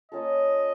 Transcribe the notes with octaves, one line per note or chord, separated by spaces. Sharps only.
A#3 C#4 F4 A4 D#5